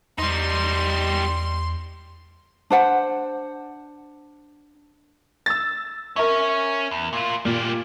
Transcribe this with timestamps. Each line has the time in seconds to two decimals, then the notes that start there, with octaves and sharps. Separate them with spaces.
0.18 E2 G3 D#4 C6
2.70 D4 C5 F#5
5.46 E6 A6
6.16 C#4 A#4 C#5 E5
6.91 E2
7.13 A#2 F4
7.45 A#2 G3 A#3